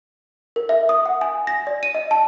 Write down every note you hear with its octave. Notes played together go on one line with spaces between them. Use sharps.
A#4
E5
D#6
F#5
G#5
A#6
D5
D#7
D#5
A5